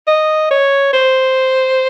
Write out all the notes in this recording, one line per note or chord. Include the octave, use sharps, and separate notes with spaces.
D#5
C#5
C5